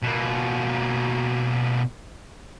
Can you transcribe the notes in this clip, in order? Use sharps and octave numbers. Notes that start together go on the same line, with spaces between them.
B2 A#3